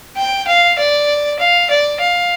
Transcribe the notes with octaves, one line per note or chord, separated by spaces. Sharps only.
G5
F5
D5
F5
D5
F5